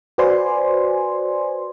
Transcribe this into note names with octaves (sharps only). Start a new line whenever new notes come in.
F#4 B4 C5 D5 G#5 C6